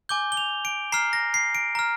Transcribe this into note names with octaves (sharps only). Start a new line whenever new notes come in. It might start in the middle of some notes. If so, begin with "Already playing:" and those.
G#5 D6 G6 G7
G7
F7
D7
A#5 F6 C7
A#6
C7
D7
A#5 F6